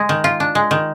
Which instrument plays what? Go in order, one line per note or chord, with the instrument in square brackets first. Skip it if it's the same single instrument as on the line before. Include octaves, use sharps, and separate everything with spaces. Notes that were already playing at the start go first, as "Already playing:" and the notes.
Already playing: [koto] G#3
D#3
F4
D4
G#3
D#3